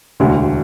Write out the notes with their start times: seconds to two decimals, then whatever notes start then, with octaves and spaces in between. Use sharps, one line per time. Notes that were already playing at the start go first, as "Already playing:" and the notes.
0.20 E1 D2 D3